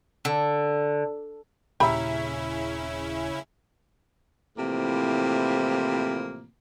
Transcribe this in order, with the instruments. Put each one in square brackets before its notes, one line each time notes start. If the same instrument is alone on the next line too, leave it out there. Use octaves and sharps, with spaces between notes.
[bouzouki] D3
[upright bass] D#1 [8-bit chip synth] C#3 C#4 E4 [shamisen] G4 B5 [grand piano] E5 A#5
[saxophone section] A2 C3 E3 F3 A#3